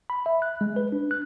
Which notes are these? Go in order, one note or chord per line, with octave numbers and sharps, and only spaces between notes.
B5
E5
F#6
G#3
B4
D4
F#6